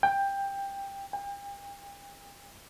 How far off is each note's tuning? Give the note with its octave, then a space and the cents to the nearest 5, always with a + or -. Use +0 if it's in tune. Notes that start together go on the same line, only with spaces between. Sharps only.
G5 +15
G5 +40